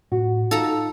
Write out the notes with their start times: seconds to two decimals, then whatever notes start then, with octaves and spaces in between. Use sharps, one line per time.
0.12 A2 F#4
0.51 D#4 F4 A4 F5 A#5